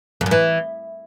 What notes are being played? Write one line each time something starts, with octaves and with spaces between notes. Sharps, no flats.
F2
F#2
E3